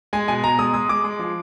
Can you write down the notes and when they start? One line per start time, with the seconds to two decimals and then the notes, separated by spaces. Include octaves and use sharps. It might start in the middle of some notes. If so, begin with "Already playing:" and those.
0.13 G#3 G#5
0.28 B2 G#5
0.44 B2 A#5
0.59 G#3 D#6
0.74 G#3 D#6
0.89 G#3 D6
1.04 G#3
1.19 F3